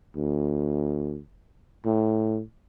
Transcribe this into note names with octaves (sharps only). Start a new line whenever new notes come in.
D2
A2